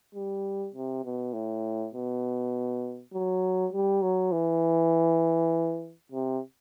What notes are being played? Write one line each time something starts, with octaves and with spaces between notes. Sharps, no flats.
G3
C3
B2
A2
B2
F#3
G3
F#3
E3
C3